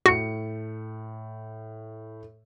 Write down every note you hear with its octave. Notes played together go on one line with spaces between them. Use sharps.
A2 F#4 C#7